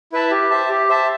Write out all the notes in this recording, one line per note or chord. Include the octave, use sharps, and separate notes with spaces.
E4 B4 E5 A5
G4
C5 E5 A5
G4
C5 E5 A5